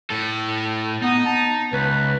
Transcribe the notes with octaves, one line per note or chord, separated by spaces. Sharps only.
A2 A4
B3 D#4
A5
C#2 B4